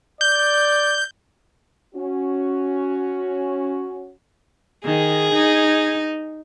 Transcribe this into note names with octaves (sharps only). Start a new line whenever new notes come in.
D5 G6
C#4 F#4
D#3 G#4
D#4